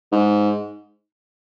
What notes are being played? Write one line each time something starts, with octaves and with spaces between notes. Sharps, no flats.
G#2